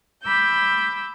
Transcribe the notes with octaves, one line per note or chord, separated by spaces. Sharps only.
B5 D6 E6 G6